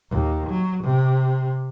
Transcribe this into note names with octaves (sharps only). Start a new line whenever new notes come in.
D#2
F#3
C3